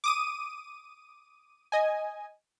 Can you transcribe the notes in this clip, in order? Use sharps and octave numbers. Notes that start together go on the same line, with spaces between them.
D6 D#6 D#7
D#5 G#5